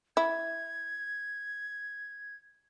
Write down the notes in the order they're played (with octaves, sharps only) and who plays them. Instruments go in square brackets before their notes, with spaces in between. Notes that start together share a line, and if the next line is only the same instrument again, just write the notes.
[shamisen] E4 [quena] G#6